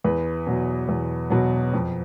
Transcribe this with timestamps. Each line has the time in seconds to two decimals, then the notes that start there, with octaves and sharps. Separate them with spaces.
0.04 E2 B4
0.47 B2 F#3
0.89 E2
1.30 B2 F#3
1.74 F2